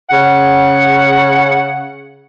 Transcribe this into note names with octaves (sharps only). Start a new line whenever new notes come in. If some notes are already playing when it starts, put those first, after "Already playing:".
C#3 F#5